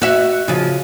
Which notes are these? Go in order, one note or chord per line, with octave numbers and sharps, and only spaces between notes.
F#4 E5
C#3 F3